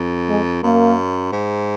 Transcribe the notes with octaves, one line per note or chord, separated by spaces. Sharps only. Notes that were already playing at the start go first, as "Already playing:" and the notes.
Already playing: F2
G#3
F#2 A#3
G#2